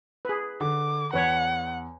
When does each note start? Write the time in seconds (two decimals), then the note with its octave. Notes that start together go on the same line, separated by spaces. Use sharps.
0.25 G#4 B4
0.61 D3 D6
1.13 E2 B4 C#5 F#5